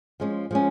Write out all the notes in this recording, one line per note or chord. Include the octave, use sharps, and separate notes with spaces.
F3 G#3 C#4
F3 G#3 C#4